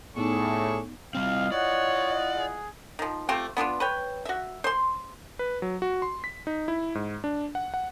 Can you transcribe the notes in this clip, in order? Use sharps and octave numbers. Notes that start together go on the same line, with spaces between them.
A2 B3 D4 D#4 G#4 A4 C#6
G3 C4 E4 F4 D#5 F5
C#5 D5 F#5
G#4
D#3 F3
A3 C4 F4 G4
B3 D4 D#4 F4
B4 C#5 G5
F#4 E5
C5 C6
B4
F#3
F#4
C6
B6
D#4
E4
G#2
D4
F#5
F#5